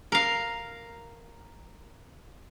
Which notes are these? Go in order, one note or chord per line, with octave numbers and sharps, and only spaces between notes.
A#4 F5